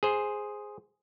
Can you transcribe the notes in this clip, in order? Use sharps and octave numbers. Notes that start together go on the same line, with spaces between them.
G#4 C5